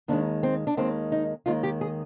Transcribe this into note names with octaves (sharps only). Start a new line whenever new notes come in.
D#2 D#3 G#3 D4
C4
D4
D#2 D#3 G#3 C4
D#4
D#2 D#3 G#3 F4
G4
G#4